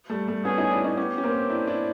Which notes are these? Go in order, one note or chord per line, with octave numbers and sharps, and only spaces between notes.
G3 A3
G3 A3
B3 C#4 G#4
C#4 D#4
D4 E4
C#4 D#4
B3 C#4 G4
C#4
A#3 C4
D4 E4
D4 E4